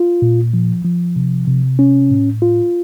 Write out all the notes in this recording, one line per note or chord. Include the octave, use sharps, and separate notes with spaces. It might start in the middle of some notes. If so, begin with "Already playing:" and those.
Already playing: F4
A#2
F3
F3
C3
C3
C#4
A2
F4